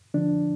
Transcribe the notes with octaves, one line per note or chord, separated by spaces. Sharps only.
D3 F3 D4